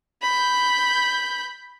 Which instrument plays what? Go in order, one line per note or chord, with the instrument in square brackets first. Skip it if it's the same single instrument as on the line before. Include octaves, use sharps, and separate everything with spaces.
[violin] B5 G6